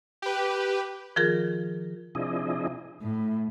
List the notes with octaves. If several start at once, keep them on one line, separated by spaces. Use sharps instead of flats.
G4 B4
D#3 F3 F4 G#4 A#4
C3 F3 D4 E4 G#4 D#5
A2